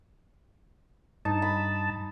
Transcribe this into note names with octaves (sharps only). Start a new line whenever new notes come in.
G2 D#4 A5
B5